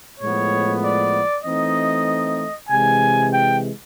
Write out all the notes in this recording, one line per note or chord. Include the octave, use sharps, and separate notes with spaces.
A2 F3 G#3 B3 C#5
D5
E3 A3 C4 D#4 D#5
C3 E3 G#3 G#5
G5